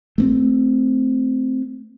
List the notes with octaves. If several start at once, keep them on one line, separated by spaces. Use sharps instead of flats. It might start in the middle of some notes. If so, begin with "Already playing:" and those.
A3 A#3 C4